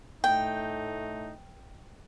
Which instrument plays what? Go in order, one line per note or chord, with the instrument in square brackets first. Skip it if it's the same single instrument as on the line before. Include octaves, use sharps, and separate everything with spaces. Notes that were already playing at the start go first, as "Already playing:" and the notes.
[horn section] A2 A3 D#4 [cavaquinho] G5